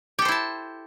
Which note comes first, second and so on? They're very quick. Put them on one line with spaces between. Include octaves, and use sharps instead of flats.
G4 A4 C5 E4 A5